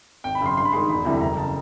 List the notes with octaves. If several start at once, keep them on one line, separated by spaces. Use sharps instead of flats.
G#1 G5
B5
F#2 C#3 C6
G2 C6
B5
D#3 G#3 C6
E1 B5
D2 C3 E3 G3
F#1 A#5
C#3 A5